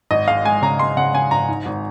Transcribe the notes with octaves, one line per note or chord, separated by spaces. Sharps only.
G#1 D#5
G#3 F5
G#3 G#5
C#3 A#5
G#3 C6
C#3 F#5
C#3 G#5
G#1 A#5
G#2
G#1